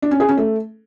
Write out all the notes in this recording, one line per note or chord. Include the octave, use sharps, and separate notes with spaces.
D4
C#4
G#4
C#4
A3